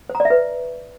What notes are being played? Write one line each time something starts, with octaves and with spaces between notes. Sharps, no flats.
C5
A#5
D5
E5
B4